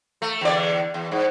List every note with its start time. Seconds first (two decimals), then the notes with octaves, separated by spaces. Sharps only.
0.22 A3
0.41 E2 D3 D5
0.94 E2
1.11 G#2